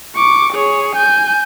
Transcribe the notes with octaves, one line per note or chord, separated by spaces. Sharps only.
C#6 D6
G#4 C#5
G#5 G6